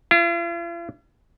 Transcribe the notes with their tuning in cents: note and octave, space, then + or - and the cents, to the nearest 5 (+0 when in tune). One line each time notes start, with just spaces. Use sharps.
F4 -45